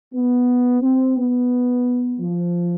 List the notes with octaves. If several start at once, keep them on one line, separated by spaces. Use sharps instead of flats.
B3
C4
B3
F3